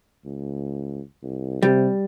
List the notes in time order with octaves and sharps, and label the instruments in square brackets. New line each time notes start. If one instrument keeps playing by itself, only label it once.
[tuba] C#2
C2
[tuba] C3 [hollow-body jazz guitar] G3